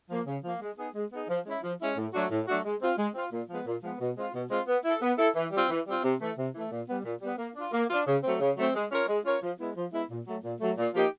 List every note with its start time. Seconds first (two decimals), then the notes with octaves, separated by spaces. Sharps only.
0.10 F3 A#3
0.26 C#3
0.44 F3 A#3
0.61 G#3
0.78 B3 D#4 G#4
0.95 G#3
1.12 B3 D#4 G#4
1.29 F3
1.46 G#3 C#4 E4
1.63 F3
1.79 G#3 C#4 E4
1.96 A2
2.13 F#3 A3 D4 F#4
2.30 A2
2.48 F#3 A3 D4 F#4
2.65 G#3
2.81 C4 F4
2.98 G#3
3.15 C4 F4
3.32 A#2
3.49 F3 G#3 B3
3.66 A#2
3.82 F3 G#3 B3
4.00 B2
4.17 G#3 C4 F4
4.33 B2
4.50 G#3 C4 F4
4.67 B3
4.85 E4 A4
5.01 B3
5.18 E4 A4
5.35 E3
5.52 G3 C4 F4
5.69 E3
5.86 G3 C4 F4
6.03 C3
6.20 E3 A3
6.37 C3
6.54 E3 A3
6.71 A#2
6.88 G3 B3
7.04 A#2
7.22 G3 B3
7.38 A#3
7.56 D4 F4
7.72 A#3
7.90 D4 F4
8.07 C#3
8.24 F#3 A3 C4
8.40 C#3
8.57 F#3 A3 C4
8.74 G#3
8.92 C#4 F4 A#4 C#5
9.08 G#3
9.25 C#4 F4 A#4 C#5
9.42 F3
9.59 G#3 B3 E4
9.76 F3
9.93 G#3 B3 E4
10.10 A#2
10.26 F#3 A3
10.43 A#2
10.60 F#3 A3
10.78 A#2
10.95 F3 A#3 D#4 G4